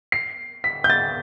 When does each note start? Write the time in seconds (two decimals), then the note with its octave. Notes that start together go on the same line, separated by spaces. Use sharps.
0.12 C7
0.64 B6
0.84 G6
0.90 A6